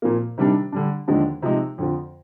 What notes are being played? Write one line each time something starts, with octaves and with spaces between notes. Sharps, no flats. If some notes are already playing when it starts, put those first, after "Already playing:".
A#2 F3 A#3
C3 D#3 G3 D4
D3 G3 D4
D#2 D3 F3 G#3 D4
C3 F3 G#3 D#4
F2 D3 F3